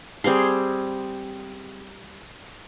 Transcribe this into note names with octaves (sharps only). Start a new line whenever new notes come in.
G3 C4 G#4 C6